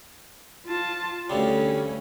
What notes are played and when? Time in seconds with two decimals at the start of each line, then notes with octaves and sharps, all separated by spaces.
0.66 F4 A5
1.30 D2 C#3 G3 C#4